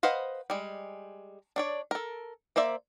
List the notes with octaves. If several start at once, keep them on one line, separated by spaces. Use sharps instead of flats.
B4 C5 D#5 F5 F#5
G3 G#3
D4 C#5 D5
A4 A#4
A#3 C5 D5 E5